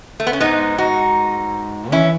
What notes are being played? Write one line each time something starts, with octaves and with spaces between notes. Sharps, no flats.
A3
B3
C#4
G#2 B3 D#4
D#4 F#4
E3 C#4 E4